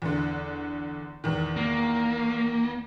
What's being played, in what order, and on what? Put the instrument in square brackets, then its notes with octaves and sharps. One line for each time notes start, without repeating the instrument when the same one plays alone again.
[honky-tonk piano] E2 D3
E2 D#3
[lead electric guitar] A#3